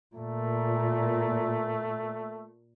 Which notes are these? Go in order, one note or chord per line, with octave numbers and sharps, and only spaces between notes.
A#2 A3